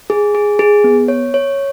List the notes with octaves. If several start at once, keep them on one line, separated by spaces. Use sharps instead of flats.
G#4
G#4
G#4
B3
C#5
C#5